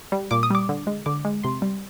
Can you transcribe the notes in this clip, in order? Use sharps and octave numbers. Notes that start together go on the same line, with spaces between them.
G3
A#2 D6
D#6
G3 D6
D3
G#3
D3 D6
G#3
C3 C6
G3